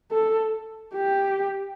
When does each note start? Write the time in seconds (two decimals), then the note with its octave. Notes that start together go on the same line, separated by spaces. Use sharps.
0.11 A4
0.95 G4